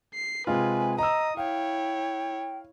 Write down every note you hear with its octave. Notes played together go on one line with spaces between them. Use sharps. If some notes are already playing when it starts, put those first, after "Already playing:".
C7
C3 G#3 F4 B4 G#5
D#5 A#5 D#6 E6
E4 C#5 F5 G5